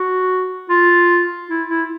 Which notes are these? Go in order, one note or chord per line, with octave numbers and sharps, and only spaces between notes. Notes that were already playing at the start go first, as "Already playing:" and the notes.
Already playing: F#4
F4
E4
E4